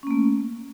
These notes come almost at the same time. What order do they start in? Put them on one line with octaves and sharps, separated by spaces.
C#4 A#3 A3